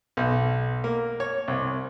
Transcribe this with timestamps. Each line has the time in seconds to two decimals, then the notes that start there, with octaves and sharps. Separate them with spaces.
0.17 B1
0.84 A#3
1.20 C#5
1.48 C2